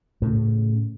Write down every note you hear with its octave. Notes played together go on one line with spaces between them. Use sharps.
A2 C#3